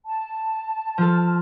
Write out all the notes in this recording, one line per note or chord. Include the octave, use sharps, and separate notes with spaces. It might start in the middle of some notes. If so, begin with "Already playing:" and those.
A5
F3 F4 A4